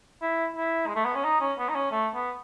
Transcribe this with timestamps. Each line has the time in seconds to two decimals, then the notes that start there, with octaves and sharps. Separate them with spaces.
0.21 E4
0.56 E4
0.87 G#3
0.95 A3
1.05 B3
1.15 C#4
1.24 D#4
1.41 C#4
1.58 B3
1.69 D#4
1.75 C#4
1.91 A3
2.14 B3